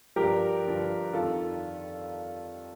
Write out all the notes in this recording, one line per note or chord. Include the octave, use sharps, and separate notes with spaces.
G2 F3 G4 A#4
G2 D3 F3
F2 D#3 F4 A4